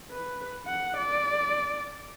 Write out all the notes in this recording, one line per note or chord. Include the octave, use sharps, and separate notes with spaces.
B4
F#5
D5